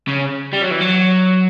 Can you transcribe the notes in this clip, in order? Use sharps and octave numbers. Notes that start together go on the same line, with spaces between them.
C#3
G3
F#3
E3
F#3